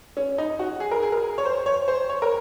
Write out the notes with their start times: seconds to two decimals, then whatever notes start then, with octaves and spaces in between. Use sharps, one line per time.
0.17 C#4
0.38 D#4
0.59 F#4
0.80 G#4
0.91 A#4
1.03 G#4
1.12 A#4
1.38 C#5
1.45 C5
1.66 C#5
1.88 C5
2.09 C#5
2.22 A#4